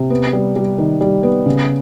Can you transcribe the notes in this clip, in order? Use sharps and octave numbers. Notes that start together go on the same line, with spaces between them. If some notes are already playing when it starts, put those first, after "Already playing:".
Already playing: C3
B3
G3
G3
D#3
G3
B3
C#3